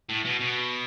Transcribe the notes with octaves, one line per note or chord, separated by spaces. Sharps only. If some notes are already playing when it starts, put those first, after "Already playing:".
A2
B2
B2